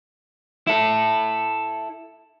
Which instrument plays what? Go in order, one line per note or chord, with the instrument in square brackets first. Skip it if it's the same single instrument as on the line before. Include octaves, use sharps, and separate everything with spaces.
[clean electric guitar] E4 A4